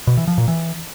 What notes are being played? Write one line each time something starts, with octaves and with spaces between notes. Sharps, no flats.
B2
E3
F3
A#2
E3